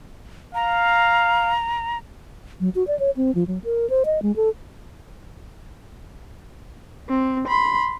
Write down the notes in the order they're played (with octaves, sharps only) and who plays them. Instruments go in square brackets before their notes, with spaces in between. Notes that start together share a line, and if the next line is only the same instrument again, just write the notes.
[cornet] F5 [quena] A#5
[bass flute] F#3
F#4
D5
C#5
C4
F3
F#3
A#4
C5
D#5
G#3
A4
[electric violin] C4
B5 C6